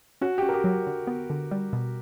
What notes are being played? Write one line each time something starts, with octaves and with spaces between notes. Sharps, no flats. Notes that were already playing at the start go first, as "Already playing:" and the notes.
C#4 F#4
C#4 G4
A#4
G4
F#3
D3
B3
D3
G3
B2